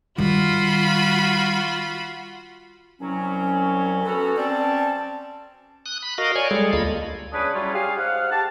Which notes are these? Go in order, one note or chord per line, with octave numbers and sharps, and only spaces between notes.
D#3 G3 F4 F#4 B5
C2 F#3 C#4
B3 C#4 F#4 A4
C4 C#4 D5 A5
D#6 F#6
B5
F#4 A#4 D#5 F5
C#5 D5 G#5
G3 G#3 G#4 A4
D2 A#3 F4 A4 D#5 B5
C#3 C#4 D4 G#4 B4
F#3 G3 C#4 E4 F4
G4 G#4 F5
G#2 F5 F#5
G4 A5